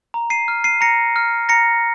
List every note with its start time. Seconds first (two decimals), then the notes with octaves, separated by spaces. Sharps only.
0.14 A#5
0.30 C7 D#7
0.48 F6
0.64 C7 D#7
0.81 A#5 A#6 C#7
1.16 F6
1.49 A#5 A#6 C#7